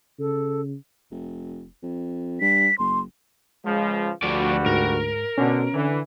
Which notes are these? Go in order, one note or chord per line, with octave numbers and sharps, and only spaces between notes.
C#3 A4
F1
F2
G2 B6
F#1 C6
C#2 C#3 F3 G#3
D2 G2 F3 G3 A3 F#4 D5
G#2 A#4
B2 D3 C#4
D3 E3